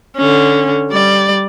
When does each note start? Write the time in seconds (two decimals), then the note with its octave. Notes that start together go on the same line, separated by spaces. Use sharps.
0.17 D3 C#4
0.91 G3 D5